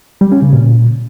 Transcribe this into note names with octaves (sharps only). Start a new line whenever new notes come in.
G3
C#4
C#3
A#2